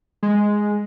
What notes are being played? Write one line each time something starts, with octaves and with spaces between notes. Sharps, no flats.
G#3